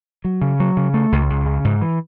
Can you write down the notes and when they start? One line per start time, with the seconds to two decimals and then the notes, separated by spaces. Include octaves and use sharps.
0.24 F#3
0.42 C#3
0.60 F#3
0.77 C#3
0.94 A3
1.12 C#2
1.30 C#2
1.46 C#3
1.64 G#2
1.81 E3